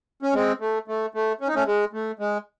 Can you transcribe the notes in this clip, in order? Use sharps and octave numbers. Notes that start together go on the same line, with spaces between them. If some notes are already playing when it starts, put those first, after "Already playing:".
C#4
G#3 C4
A3
A3
A3
C#4
D#4
A3 C#4
G#3
A3
G#3